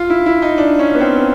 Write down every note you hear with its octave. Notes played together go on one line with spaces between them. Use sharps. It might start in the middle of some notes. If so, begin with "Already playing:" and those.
Already playing: F4
E4
E4
D#4
D4
C#4
B3
C4